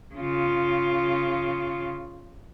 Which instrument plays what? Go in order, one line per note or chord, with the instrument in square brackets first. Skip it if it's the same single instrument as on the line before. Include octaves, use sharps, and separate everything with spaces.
[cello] C#3 F4